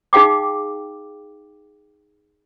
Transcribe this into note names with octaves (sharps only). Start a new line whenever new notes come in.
D#4 G#4 F5 G5 D6